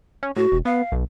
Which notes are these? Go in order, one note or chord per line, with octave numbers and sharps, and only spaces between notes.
C#4
A2 F#4
E1
B3 F5
B1